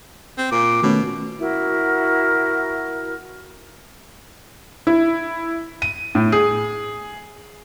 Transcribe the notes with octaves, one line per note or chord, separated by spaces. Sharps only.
C4
A#2 D6
B2 D#3 A3 C#4
E4 F#4 A#4
E4
D#7
A2
G#4